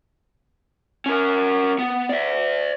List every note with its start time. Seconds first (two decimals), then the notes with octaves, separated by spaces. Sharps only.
1.06 C#4 A#4
1.79 B3
2.09 D5 E5